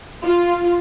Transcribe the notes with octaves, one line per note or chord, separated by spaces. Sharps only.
F4